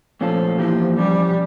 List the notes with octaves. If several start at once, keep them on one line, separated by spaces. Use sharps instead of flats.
A#2 F3 A3 C#4 F4 A4
E2 E3 F3 A#3 E4 G4
F3 G3 C#4 G4